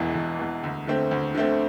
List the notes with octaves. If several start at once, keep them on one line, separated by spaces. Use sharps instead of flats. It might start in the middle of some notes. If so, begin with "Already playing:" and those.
Already playing: E1 E2 E3
E1
E2 E3
D2
D3 A3 C4
D2
D3 A3 C4